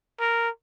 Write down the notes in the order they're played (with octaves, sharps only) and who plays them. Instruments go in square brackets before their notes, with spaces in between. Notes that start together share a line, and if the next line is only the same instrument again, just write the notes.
[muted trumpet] A#4